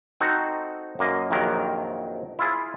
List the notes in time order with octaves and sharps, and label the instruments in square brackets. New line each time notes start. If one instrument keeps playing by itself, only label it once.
[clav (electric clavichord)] C4 D#4 F#4 A4
F#2 A#3 D#5
A#1 F2 C3 D#3 F#3 A#4
E4 F4 G#4